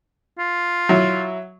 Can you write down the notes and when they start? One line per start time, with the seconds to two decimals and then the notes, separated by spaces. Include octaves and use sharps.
0.39 F4
0.89 F#3 E4